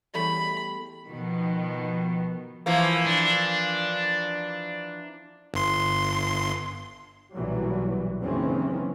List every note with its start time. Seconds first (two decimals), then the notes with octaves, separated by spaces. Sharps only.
0.14 E2 G3 A3 B5
1.09 B2 D#3 F3 B3
2.66 E3 F3 A#3
3.06 D4
5.54 G1 C6
7.33 B1 A#2 E3 F#3 G3
8.22 F#1 D#2 D#3 E3 C4 C#4